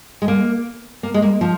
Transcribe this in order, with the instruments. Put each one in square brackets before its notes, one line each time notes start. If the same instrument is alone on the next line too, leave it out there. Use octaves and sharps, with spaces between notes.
[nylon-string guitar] G#3
A#3
A#3
G#3
A#3
F3